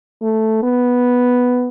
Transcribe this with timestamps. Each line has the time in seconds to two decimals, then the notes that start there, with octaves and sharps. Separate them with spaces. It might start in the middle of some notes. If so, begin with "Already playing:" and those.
0.22 A3
0.63 B3